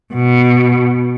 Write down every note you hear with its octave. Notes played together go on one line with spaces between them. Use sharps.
B2